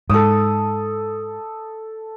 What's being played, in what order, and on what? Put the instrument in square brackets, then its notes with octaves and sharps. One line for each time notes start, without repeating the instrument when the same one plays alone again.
[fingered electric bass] G#2 [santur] A4 D#6